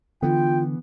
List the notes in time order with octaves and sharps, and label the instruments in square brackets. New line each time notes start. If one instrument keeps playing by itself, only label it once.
[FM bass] D3 [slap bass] E3 B3 [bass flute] F4 [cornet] G5